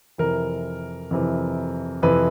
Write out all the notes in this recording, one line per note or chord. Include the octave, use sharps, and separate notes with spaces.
F2 C3 E3 A#4
F2 C3 E3
F2 C3 E3 B4